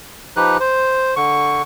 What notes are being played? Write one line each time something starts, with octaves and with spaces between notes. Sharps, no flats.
F3 D#4 G4 B4 F#6
C5
D3 C#6